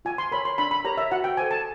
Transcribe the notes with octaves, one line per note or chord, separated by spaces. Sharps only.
F4 G#5
C6
A#4 C#5 B5
C6
D4 B5
B5
G4 A#4 C#5 A#5
E5
F#4 F#5
G5
A4 C5 G#5
A5